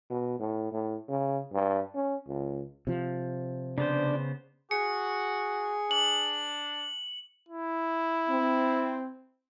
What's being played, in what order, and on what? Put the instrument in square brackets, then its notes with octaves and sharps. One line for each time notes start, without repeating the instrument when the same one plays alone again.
[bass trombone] B2
A2
A2
C#3
G2
C#4
C#2
[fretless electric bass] C3 F3
[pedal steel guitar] C#3 B3 C5 [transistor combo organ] D4
[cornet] F#4 [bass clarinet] G#4 [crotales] C#7
[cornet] D4 [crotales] F#7
[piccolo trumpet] E4
[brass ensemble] C4